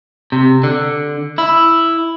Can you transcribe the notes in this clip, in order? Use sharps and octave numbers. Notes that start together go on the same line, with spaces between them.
C3
D3
E4